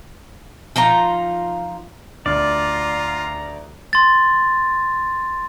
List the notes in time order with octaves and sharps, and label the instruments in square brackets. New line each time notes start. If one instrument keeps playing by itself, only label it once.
[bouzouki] F3 D#4 F4 A#5
[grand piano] D2 D4 F6 [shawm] F4 [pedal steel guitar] D5 [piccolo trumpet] A#5
[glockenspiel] C6 A6